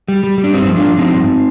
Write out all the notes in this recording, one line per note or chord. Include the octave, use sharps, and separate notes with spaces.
G3
G3
G3
D4
G2 C4 D#4
F3
D4 F4
F3
F3 C4 D#4
G2